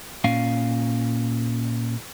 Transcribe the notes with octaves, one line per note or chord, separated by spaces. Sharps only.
A#2 C#4 F5